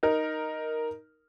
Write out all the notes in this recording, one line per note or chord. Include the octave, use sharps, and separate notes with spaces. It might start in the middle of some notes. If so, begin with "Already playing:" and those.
D#4 A#4